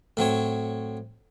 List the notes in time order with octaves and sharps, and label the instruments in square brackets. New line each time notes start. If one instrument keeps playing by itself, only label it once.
[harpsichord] A2 F#3 C4 C#5